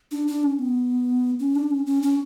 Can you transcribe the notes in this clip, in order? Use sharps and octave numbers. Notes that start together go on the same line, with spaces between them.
D4
D4
C#4
B3
C#4
D4
C#4
C#4
C#4